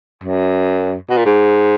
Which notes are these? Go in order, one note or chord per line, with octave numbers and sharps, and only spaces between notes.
F#2
B2
A#2
G#2